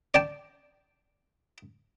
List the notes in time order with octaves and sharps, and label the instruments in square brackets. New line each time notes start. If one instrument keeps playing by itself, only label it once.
[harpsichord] D5 G5 A5